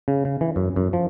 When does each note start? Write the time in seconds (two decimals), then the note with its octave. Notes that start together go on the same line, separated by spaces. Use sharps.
0.08 C#3
0.25 C#3
0.41 E3
0.56 F#2
0.76 F#2
0.93 F3